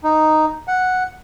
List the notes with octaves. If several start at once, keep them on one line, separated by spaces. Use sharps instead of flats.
D#4
F#5